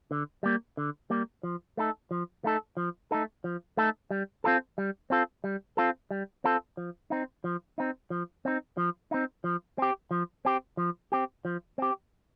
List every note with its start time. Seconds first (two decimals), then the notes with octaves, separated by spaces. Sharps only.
0.11 D3
0.43 G3 A#3
0.77 D3
1.10 G3 A#3
1.43 F3
1.77 A3 D#4 A4
2.11 F3
2.44 A3 D#4 A4
2.77 F3
3.11 A3 D#4 A4
3.44 F3
3.77 A3 D#4 A4
4.11 G3
4.44 C4 F4 A4
4.78 G3
5.10 C4 F4 A4
5.44 G3
5.77 C4 F4 A4
6.11 G3
6.44 C4 F4 A4
6.77 F3
7.10 C4 D#4
7.44 F3
7.78 C4 D#4
8.10 F3
8.45 C4 D#4
8.77 F3
9.11 C4 D#4
9.44 F3
9.78 C4 G4
10.11 F3
10.45 C4 G4
10.77 F3
11.12 C4 G4
11.45 F3
11.78 C4 G4